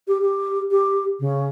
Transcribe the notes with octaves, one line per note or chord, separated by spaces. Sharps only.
G4
G4
G4
C#3